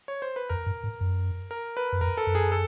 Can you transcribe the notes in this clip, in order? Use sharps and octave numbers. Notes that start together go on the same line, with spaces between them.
C#5
C5
B4
F2 A#4
G2
G#2
F#2
A#4
B4
F#2
F2 A#4
A4
F#2
G#4
A4